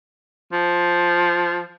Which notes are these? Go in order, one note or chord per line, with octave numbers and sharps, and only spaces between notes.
F3